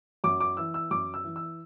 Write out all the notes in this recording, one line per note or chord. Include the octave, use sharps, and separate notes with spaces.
F#2 D6
D6
E3 E6
E6
F#2 D6
E6
E3
E6